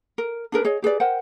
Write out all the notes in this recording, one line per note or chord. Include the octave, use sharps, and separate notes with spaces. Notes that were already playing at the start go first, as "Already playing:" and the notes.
A#4
D4 G#4 A#4 B4
G#4 C#5 D#5
G4 G#4 B4 D5
A#4 C5 F#5 G5